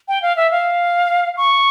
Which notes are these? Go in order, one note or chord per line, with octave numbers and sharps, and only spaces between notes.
G5
F5
E5
F5
C#6